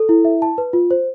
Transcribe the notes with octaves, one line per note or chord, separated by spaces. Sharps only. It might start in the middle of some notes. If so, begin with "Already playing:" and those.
Already playing: A4
E4
E5
A5
B4
F4
C5